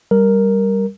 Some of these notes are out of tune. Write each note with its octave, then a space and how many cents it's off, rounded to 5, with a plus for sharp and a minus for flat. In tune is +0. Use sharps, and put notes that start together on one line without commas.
G3 +0 A#4 +0